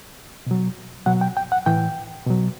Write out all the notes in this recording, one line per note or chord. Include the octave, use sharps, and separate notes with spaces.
B2 F#3
B2 F#3 F#5
G5
G5
F#5
A2 E3 G5
B2 F#3